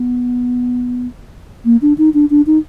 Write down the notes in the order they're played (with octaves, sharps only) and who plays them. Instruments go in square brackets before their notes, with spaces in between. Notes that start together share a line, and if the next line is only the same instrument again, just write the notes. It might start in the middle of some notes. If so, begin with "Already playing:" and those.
Already playing: [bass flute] B3
A#3
D4
D#4
D4
D4
D#4